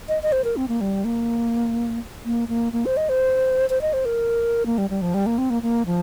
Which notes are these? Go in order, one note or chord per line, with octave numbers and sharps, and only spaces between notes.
D#5
D#5
C5
A#4
C4
A#3
G3
A#3
A#3
A#3
A#3
C5
D#5
C5
C5
D#5
C5
A#4
A#3
G3
G3
F3
G3
A#3
C4
A#3
A#3
F3